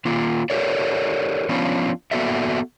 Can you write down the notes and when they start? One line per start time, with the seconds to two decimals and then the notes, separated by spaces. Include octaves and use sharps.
0.05 D#3 A#3 F4
0.50 G4 A4 A#4 C#5 D5
1.49 F3 B3 C#4 D4 F4
2.11 A#3 B3 F#4 A4 D5 E5